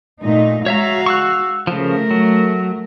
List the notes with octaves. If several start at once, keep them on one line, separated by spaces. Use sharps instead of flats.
A#2 A3 D#4
G#3 F#4 C#5 E5 F5 A#5
C#6 E6 F#6
C#3 F3 A3 A#4
F#3